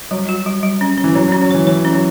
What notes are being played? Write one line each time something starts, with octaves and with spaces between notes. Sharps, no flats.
F#3 G3
F#4
G3
G3
C#4
C#4
E3
F#3 C#4
F#3 C#4
F#3
E3 C#5
E3 C#5
C#4
F#3